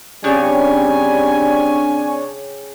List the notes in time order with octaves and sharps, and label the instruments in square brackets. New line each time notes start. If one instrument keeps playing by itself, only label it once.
[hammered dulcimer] C#3 G4 [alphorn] G3 [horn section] C4 G#5 [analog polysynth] D4 C#5